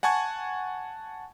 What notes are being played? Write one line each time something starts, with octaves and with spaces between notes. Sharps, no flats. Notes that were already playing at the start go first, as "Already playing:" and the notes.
F#5 G#5 A5 C#6 G#6